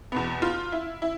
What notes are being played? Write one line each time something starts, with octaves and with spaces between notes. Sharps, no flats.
E2 B2 B3
F4
E4
E4